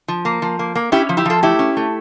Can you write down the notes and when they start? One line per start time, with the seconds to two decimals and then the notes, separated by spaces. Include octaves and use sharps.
0.08 F3
0.25 A#3
0.42 F3
0.59 A#3
0.75 A#3
0.92 C#4 E4 G4
1.09 F3
1.17 E4 G4
1.25 F3 F4 A4
1.43 A3 E4 G4
1.59 C#4
1.77 A3